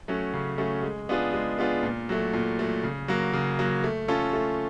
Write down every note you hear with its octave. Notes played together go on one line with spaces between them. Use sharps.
F#3 A3 C#4
C#3
F#3 A3 C#4
G#3
B3 D4 F4 G#4
G#3
B3 D4 F4 G#4
A#2
F#3 A3
A#2
F#3 A3
C#3
F#3 A#3
C#3
F#3 A#3
A3
C#4 F4 A4
A3